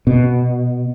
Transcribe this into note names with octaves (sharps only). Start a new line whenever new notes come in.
B2